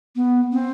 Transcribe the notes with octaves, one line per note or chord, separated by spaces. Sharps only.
B3
C4